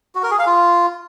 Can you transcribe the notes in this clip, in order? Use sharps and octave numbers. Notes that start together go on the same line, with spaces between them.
F#4
A#4
G#4
F5
F4